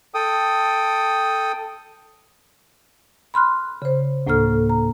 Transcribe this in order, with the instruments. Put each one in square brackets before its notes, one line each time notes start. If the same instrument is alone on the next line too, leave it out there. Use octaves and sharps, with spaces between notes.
[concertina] A4 G5 D#6
[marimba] B5 C6 F6 F#6
C#3 C5
D2 A2 A#3 A4 F6
A#5